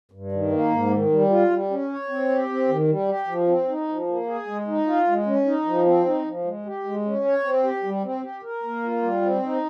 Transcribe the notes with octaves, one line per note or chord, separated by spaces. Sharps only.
G2
D#3
A#3
G#2
D#3
G3
F4
G3
C#4
C#5
C4
G4
C4
D#3
G3
G4
F3
C4
D#4
F3
A#3
G#4
G#3
D#4
F4
G#3
C#4
D#4
F3
C4
D#4
F3
G#3
G4
G#3
C#4
C#5
C4
G4
G3
C4
G4
A#4
A#3
F4
G3
C4
D#4